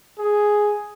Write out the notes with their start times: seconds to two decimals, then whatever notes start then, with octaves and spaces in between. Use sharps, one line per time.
0.19 G#4